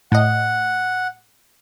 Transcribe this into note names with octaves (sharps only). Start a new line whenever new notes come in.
A2 D#5 F#5